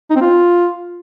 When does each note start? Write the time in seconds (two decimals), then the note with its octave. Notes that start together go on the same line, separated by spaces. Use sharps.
0.10 D#4
0.16 C4
0.21 F4